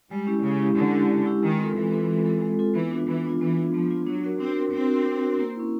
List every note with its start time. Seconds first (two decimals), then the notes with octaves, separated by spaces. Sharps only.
0.11 G3 G#3
0.27 C#4 E4 G4
0.43 C#3 G#3
0.60 C#4 E4 G4
0.76 D3 G#3
0.94 C#4 E4 G4
1.10 G#3
1.26 C#4 E4 G4
1.43 D#3 G#3
1.59 C4 F4 A4
1.76 E3 G#3
1.92 C4 F4 A4
2.09 G#3
2.26 C4 F4 A4
2.42 G#3
2.59 C4 F4 A4
2.75 E3 B3
2.91 D4 F4
3.09 E3 B3
3.25 D4 F4
3.41 E3 B3
3.58 D4 F4
3.74 F3 B3
3.90 D4 F4
4.07 F#3 D4
4.24 F#4 A#4
4.40 C4 D4
4.57 F#4 A#4
4.73 C4 D4
4.90 F#4 A#4
5.06 D4
5.24 F#4 A#4
5.40 A#3
5.56 C#4 E4